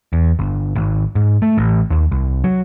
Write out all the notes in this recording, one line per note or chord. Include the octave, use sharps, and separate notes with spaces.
E2
G1
G#1
G#2
A3
A1
D#2
C2
F#3